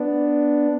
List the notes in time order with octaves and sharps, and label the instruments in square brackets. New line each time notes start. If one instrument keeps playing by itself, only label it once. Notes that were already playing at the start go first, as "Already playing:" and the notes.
Already playing: [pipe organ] B3 D4